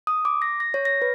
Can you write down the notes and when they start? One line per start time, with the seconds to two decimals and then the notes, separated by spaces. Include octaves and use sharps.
0.07 D#6
0.25 D6
0.42 A#6
0.60 A#6
0.74 C#5
0.85 A#6
1.02 B4